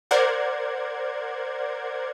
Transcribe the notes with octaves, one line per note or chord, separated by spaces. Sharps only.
A#4 C5 D5 F#5 G#6